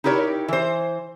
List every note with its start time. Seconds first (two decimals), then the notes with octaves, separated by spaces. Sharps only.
0.04 D#4 E4 G4 A#4 C#5
0.48 E3 C5